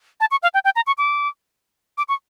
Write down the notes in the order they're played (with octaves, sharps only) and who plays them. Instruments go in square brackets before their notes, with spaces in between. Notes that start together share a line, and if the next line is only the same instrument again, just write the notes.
[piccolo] A5
C#6
F5
G5
G5
A#5
C#6
D6
D6
C#6